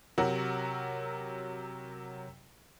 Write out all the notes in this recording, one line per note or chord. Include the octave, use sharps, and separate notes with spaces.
C3 F#3 F#4 A#4